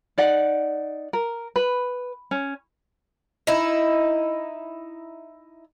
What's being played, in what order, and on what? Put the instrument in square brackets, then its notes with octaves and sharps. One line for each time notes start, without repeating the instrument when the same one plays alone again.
[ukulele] D#4 D5 F#5
A#4
B4
C#4
[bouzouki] D#4 E4